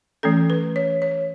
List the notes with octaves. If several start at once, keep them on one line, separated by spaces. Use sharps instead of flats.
E3 A3 C#4 A4
B4
C#5
C#5